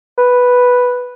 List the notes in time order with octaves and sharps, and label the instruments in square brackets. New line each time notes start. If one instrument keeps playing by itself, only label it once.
[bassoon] B4